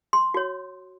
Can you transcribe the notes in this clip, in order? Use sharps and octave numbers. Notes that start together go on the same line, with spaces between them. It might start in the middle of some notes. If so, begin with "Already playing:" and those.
C6
F#4 C#5